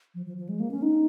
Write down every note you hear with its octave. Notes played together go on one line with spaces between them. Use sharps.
F3
F3
F3
G#3
A#3
C#4
D#4